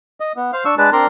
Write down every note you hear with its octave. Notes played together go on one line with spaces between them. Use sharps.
D#5
B3
C5 F5
D4 C#6 E6
G#3 D4 B4 A5
C4 D4 A#4 D5 A#5 C6